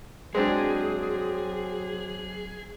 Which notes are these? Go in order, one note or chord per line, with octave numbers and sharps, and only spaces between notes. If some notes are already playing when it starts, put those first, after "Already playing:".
F#3 G#3 C4 D4 G#4